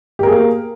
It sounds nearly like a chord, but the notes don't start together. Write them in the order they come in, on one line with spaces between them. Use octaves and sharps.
G4 A#4 G#4 A#3